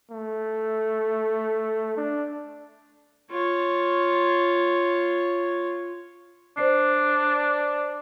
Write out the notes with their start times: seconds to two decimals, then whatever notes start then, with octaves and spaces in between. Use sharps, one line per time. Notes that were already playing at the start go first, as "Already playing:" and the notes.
0.11 A3
1.97 D4
3.31 F4 C#5
6.57 D4 C5 D5 C7